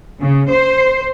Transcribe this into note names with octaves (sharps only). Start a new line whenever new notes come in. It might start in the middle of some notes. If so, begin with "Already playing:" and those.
C#3
C5